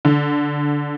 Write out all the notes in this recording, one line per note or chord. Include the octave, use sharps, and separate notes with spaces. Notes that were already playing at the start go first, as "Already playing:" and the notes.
D3